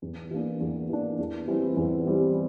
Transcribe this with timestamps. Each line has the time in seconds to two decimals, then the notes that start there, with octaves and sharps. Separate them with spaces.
0.02 E2
0.31 E3 A#3 D4
0.60 E2
0.89 E3 A#3 D4
1.19 E2
1.48 E3 G3 C4 E4
1.77 E2
2.06 E3 G3 C4 E4